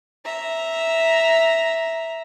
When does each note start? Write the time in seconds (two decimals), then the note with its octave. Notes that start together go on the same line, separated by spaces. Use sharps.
0.25 E5 A#5